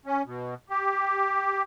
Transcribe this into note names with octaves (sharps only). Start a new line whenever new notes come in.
C#4
B2
G4